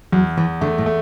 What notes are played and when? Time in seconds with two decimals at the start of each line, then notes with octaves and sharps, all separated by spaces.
0.12 E2 F#3
0.37 E2 E3
0.61 D3 A3
0.78 A2
0.86 A3